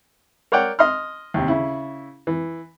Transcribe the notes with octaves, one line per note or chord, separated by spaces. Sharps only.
A#4 C#5 D5 F#5 G5
D#5 C6 F6
D#2 C3
C#3 E4
E3